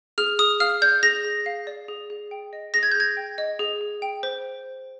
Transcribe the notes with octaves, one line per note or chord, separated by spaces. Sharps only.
G#4 F6
G#4 D#6
F5 F6
D5 G6
G#4 A#6
G#4
F5
D5
G#4
G#4
G5
D#5
G#4 A#6
G#6
G6
G#4 G#6
G5
D#5
G#4
G#4
G5
C5